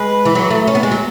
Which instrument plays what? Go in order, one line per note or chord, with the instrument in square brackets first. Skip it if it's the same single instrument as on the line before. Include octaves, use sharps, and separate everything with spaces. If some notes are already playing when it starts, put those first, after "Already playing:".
Already playing: [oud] G#3 [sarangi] B4
[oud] E3
F#3
A3
C#4
B3
G#3
F#3